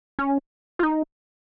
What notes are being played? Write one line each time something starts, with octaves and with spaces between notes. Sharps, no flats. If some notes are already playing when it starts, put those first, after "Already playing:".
C#4
F4
D#4